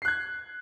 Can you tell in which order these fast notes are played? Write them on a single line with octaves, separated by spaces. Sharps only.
C7 F#6 G#6